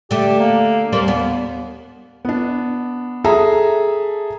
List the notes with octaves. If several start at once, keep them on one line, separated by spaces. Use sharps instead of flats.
D3 A3 G4
A#3
D#2 G3 A#3 C4
B3
B3 D4
G#4 A4 E5 A5 A#5